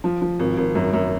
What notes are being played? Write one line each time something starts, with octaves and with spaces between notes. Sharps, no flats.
F3
F3
G#1
G#1
F#2
F#2